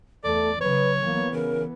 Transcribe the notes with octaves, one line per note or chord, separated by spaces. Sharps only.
E2 A3 A4 D5
C#3 F#3 B4 C#5
E3 A#3 B3
C#3 A#4